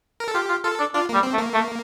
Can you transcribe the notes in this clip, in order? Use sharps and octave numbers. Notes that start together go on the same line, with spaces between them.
A#4
A4
F4 G4
F4
F4 A4
D4
D4 F4
G3 A#3
C4
A3
A#3
A3